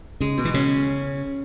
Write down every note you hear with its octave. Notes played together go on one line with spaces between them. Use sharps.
C#3 G#3
B2
E3
C#3 C#4